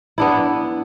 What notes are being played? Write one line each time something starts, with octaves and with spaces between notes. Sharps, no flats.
B3 D4 E4